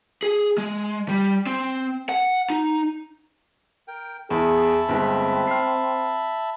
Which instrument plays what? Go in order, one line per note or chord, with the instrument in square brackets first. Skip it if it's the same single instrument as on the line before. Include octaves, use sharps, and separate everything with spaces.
[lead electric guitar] G#4
G#3
G3
C4
F#5
D#4
[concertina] A#4 G5
[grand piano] E2 [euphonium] G#4 [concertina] E5 A5 B5
[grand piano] G1 G#3 [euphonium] C4
[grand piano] F6 C7